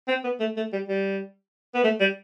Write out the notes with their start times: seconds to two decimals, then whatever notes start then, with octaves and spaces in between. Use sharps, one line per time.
0.08 C4
0.24 B3
0.40 A3
0.57 A3
0.73 G3
0.88 G3
1.74 B3
1.84 A3
2.00 G3